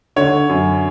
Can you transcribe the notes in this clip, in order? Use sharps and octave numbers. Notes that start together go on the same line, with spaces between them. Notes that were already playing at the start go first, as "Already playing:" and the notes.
D3 C#5
F#2